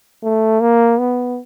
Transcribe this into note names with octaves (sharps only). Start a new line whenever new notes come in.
A3
A#3
B3